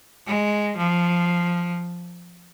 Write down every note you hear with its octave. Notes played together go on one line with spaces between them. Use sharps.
G#3
F3